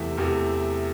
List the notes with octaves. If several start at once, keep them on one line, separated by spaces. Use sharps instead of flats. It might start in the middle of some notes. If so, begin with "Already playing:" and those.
Already playing: E2 C3 E3 A3 E5
E2 C3 E3 A3